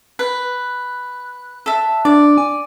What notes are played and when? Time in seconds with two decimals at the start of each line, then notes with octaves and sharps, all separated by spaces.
0.19 B4 F#6
1.66 A4 E5
2.05 D4 D5
2.38 G#5